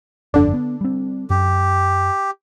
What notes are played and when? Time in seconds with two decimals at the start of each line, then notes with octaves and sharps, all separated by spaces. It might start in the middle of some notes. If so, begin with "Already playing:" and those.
0.34 G1 F2 D3 D4
0.54 B3
0.81 G3 C4
1.30 F#2 G4